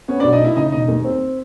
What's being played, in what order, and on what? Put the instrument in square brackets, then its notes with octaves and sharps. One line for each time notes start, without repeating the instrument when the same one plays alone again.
[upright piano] B3 [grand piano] C#4 C#5
[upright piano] B1 [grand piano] D4 D5
[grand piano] D#4 D#5
[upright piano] A#2 [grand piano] E4 E5
[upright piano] C#3 [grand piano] D#4 D#5
[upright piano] E1 [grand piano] D#4 D#5
[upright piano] D#2
C4